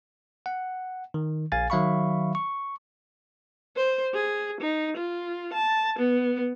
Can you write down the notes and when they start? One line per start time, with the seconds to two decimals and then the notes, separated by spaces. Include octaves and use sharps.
0.46 F#5
1.14 D#3
1.52 A#1 F5 G#5 A6
1.70 D#3 F#3 E5 F5 B5 C#6
2.35 C#6
3.76 C5
4.14 G#4
4.61 D#4
4.96 F4
5.53 A5
5.99 B3